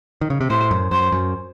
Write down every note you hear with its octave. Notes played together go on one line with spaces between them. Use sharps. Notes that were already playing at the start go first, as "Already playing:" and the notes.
D#3
C#3
C3
A2 C5
F#2
F#2 C5
F#2